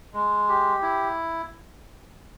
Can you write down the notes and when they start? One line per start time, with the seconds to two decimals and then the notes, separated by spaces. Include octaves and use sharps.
0.13 G#3
0.49 G4
0.82 E4